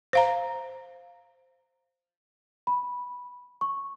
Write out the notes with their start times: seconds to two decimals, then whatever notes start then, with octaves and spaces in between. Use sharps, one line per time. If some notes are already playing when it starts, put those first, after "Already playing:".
0.13 C5 F5 A#5
2.67 B5
3.61 C#6